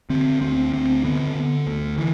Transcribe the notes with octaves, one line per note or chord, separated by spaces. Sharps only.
D3 C4
D2 C4
D2 C4
D3 B3
D3
D2
E3